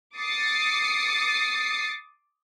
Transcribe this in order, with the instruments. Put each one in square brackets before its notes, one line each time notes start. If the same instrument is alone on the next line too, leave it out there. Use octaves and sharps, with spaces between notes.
[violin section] D6 D#6 A6 C7 C#7